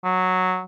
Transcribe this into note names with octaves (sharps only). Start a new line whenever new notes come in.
F#3